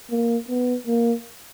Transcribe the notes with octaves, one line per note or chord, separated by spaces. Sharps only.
A#3
B3
A#3